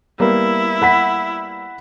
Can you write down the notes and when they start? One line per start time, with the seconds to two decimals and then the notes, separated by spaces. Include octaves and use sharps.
0.20 G3 A#3 B3 E4
0.82 F#5 B5 B6